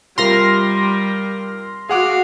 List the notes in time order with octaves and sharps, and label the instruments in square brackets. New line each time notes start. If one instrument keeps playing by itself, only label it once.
[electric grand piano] C3 F4 A#4 [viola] G3 [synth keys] C6 F6 A#6
[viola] F#4 F5 [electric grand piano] G#4 F#5 D6